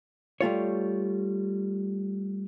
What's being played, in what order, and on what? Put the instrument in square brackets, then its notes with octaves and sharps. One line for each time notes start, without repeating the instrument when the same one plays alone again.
[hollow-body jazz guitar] G3 A3 F4 C#5